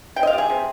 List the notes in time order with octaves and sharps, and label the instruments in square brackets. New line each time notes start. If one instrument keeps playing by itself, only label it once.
[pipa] C3 G5
D#5
F5
G3
G#4
C3